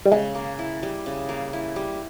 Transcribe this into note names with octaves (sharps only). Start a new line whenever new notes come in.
G3
C#3 G#3
A#3
E4
G3
C#3
A#3
E4
G3